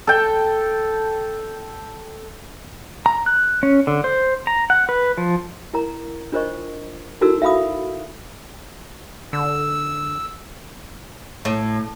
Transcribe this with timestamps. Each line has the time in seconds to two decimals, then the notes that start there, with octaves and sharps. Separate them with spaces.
0.07 A4 G5
3.06 A#5
3.26 F#6
3.63 C#4
3.87 D3
4.04 C5
4.47 A#5
4.70 F#5
4.89 B4
5.18 F3
5.73 E4 A#4 A#5
6.32 D4 F4 A#4 C5 D#5 C#6
7.21 D#4 E4 F#4 A4 A#4 E6
7.42 E5 F5 B5 D#6
9.33 D3 E6
11.45 A2